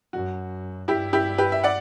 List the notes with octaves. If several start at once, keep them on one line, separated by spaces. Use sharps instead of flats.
F#2 F#4
G2 E4 G4
E4 G4
G4 B4
E5
D5 F#5